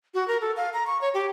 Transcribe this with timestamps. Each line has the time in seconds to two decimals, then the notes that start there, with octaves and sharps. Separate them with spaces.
0.14 F#4
0.28 A#4
0.41 A4
0.57 F5
0.73 A#5
0.87 C#6
1.01 C#5
1.14 G4